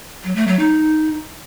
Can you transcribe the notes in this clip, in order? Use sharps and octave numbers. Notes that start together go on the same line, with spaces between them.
F#3
A3
F#3
D#4